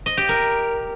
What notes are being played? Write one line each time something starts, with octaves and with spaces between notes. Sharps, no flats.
D#5
G4
A#4